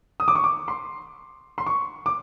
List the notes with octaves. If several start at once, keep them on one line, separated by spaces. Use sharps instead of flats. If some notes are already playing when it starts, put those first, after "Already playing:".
D#6
D6
C#6
D6
C6
C6
C#6
D6